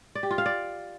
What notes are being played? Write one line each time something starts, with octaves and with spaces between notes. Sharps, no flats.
D5
G4
F4
F5
D5